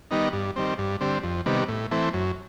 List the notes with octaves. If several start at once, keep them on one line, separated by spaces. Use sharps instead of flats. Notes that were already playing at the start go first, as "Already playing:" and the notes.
D#3 G3 B3 D#4
G2
D#3 G3 C4
G2
D3 G3 C4
F2
C3 D#3 G3 B3
A2
E3 A3 C4
F#2